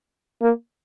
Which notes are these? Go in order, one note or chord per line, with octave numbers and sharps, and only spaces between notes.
A#3